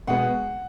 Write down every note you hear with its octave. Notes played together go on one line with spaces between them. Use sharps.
B2 G#3 B3 F#5